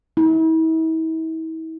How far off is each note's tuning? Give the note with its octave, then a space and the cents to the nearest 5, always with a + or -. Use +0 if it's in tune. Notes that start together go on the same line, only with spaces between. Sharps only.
E4 -40